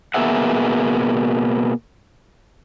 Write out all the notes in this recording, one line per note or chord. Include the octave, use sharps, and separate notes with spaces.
B2 A#3 B3 G#4 E5 F#5